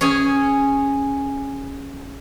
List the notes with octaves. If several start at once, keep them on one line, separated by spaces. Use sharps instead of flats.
C#4 G#4 G#5